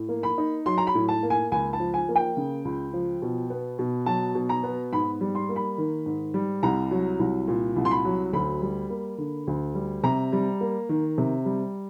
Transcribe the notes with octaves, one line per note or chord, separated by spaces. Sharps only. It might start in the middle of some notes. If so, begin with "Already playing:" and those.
Already playing: A2
A#3
B5
D#4
F#3 C6
A#5
B5
A2
A5
A#3
G#5
C#2 G#5
A5
F3
G#5
A#3
G5
C#3
C#2
F3
B2
B3
B2
F#3 A5
B2
A#5
B3
G#2 B5
G3
C6
A#3
B5
D#3
G#2
G3
C2 A#5
F#3
C2
A#2
C2
C6
B5
F#3
D2 B5
G3
A#3
D3
D2
G3
C3 A#5
G3
A#3
D#3
C3
G3